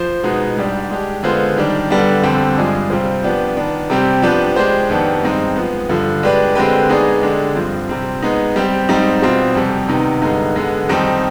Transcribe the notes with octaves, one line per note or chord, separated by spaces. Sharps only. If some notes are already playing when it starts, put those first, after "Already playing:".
Already playing: F3 C5
B2 G#3 B3 D#4
G#2 G3 D4 G4
G#3 D4 G4
D3 G#3 B3 F4 C5
D#3 G3 D4
D3 G3 B3 D4
F2 D3 G3 C4
G2 F3 G#3 D4 G#4
C3 G3 C4 F4 C5
F3 B3 D4 G4
D#3 B3 D4
C3 G3 C4 G4
F3 B3 D4 G4 B4
G#3 D4 G4 C5
F2 D#3 B3 D4 G4
G2 D#3 G#3 C4 D#4
F3 G#3 B3
G2 D3 F3
G#3 D4 G4 B4 D5
D3 G#3 C4 G4 B4
G#3 B3 D#4 G#4 D5
D3 G#3 D4 G4
G2 F3 C4
C3 G3 C4
G#3 B3 D#4
G3 C4 G4
G#2 G3 C4 D#4
B2 G3 C4 F4
F2 C3 G3
C3 D#3 B3 D#4
G2 D3 G#3 B3 D#4
D3 G#3 B3
F2 D#3 G3 C4 D#4